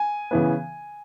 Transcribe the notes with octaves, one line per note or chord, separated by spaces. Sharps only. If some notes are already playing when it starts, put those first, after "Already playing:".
Already playing: G#5
C#3 E3 B3